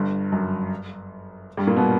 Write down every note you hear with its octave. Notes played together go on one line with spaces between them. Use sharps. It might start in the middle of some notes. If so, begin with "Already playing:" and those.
Already playing: G1 G2
F#2
G2 G3
A#2 A#3
B2 B3